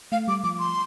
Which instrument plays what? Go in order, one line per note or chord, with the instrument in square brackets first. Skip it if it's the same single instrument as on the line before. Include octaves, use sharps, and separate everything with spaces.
[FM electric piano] A3 [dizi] F5
[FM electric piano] G3 [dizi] D6
[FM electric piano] F3 [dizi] D6
[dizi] C6